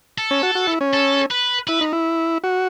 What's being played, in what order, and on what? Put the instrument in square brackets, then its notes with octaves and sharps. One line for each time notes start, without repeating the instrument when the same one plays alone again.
[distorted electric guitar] A4
[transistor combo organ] C#4
F#4
F#4
E4
C#4
[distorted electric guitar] A4
B4
[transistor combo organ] E4 [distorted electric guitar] B4
[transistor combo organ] D#4
E4
F#4